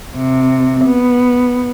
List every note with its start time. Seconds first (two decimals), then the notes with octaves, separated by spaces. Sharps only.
0.17 C3
0.85 B3